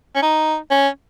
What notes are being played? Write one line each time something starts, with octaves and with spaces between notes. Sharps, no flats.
C#4
D#4
C#4